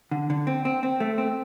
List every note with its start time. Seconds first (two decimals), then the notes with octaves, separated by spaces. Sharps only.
0.11 D3
0.30 D3
0.47 C4
0.65 C4
0.83 C4
1.00 A3
1.18 C4